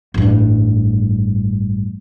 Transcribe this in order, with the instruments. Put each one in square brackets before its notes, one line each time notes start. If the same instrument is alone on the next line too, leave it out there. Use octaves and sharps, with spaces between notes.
[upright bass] A1 G2